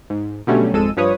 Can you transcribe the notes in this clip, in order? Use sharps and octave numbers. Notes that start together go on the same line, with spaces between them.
G#2
B2 D3 F#3 G3 A3 C#4
G#1 F2 G#3 A4 E6 D#7
G2 F3 B4 C#5 D#6